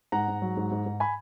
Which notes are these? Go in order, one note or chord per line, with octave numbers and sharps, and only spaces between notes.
G#2 F#5 A#5
G#2
F#3
G#2
G#2
G#2
G#5 B5